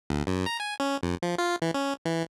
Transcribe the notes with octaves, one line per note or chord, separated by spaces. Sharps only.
D2
F#2
A#5
G#5
C#4
F2
F3
F4
E3
C#4
E3